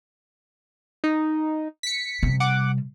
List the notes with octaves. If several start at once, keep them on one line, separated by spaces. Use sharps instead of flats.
D#4
B6 C#7
C3 G3
F#5 D6